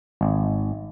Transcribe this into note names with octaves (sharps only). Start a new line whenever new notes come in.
G#1